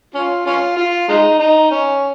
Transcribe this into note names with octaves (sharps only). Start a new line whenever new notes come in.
C#4 F4
C#4 F4
F4
G#3 D#4
D#4
C#4